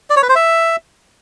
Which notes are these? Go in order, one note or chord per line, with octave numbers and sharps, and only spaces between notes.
D5
C#5
B4
C5
E5